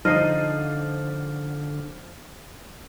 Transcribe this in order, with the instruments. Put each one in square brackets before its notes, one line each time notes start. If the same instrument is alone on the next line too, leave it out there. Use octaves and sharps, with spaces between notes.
[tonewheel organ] D3 [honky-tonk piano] F3 C7 D#7 [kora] D#4 D#5 [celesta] F6